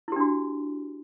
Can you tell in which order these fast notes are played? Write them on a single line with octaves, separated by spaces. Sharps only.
E4 G4 D4 F#4